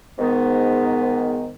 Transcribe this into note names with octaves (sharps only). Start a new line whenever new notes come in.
G#2 D#3 B3